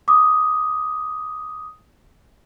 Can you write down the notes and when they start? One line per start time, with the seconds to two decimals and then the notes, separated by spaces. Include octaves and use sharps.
0.08 D6 D#6